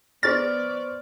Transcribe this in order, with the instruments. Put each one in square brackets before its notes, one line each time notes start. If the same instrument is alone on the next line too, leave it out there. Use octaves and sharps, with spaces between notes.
[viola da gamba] B3 D5 [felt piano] C5 C#6 F6 [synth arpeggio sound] A6